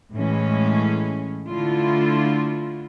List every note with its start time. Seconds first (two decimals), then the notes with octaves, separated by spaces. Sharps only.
0.14 A2 E3 G#3 C#4
1.47 D3 A3 E4 F4